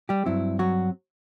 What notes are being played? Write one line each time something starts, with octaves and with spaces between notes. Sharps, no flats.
G3 G4
G2 F#3 C4 E4
F#3 F#4